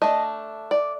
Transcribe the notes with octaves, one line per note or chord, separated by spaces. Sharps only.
A3 D4 D#5
D5